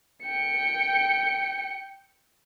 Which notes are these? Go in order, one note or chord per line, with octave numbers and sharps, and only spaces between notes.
G5 C#7